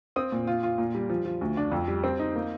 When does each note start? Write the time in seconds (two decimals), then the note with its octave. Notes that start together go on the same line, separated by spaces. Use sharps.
0.16 C4 D#6
0.32 A#2
0.47 F4
0.63 F4
0.78 A#2
0.95 G3
1.10 F3
1.25 F3
1.41 D2
1.57 D4
1.72 F2
1.88 G3
2.04 C4
2.19 D#4
2.35 A#3